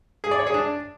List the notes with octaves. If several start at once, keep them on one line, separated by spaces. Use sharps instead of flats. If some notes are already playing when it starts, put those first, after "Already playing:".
G#4
D5
C#5
G#4
D4